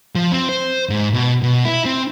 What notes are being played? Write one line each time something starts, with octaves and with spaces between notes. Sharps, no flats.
F3
C4
C5
G#2
B2
B2
E4
C4